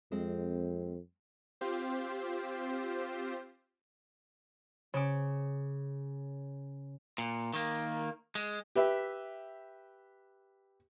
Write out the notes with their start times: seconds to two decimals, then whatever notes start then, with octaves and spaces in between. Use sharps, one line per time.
0.12 F2 G#3 C4
1.61 C4 F4 G4 C5
4.94 C#3 D6
7.18 A#2
7.53 D#3 A#3
8.35 G#3
8.76 G4 B4 E5 G5